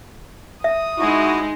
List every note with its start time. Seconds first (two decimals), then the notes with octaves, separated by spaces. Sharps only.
0.64 E5 D#6
0.98 G#3 D#4 E4 F#4